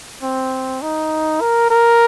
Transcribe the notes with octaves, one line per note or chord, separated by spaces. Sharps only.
C4
D#4
A#4
A#4